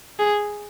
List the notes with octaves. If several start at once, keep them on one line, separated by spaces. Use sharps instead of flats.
G#4